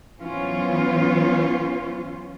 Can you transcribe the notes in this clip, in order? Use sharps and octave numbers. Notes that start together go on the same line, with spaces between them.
E3 F#3 B3 C#4 F4 C5